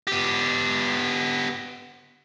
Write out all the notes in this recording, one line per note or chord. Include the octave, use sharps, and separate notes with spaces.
B3 G4